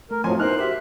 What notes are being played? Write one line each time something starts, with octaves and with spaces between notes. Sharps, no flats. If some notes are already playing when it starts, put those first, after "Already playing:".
A3 A#4
F2 A2 F3 F#3 G#5 C6
B3 D#4 E4 A#4 C5 F6 F#6
F#4 G4 C5 E5